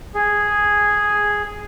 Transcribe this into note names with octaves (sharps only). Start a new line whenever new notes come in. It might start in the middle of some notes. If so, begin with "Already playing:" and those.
G#4